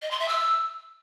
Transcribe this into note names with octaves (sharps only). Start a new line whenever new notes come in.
D#5
C6
E5
E6